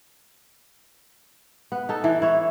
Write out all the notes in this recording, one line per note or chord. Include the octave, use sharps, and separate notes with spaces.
B3
D#4 A4
E3
E4 C#5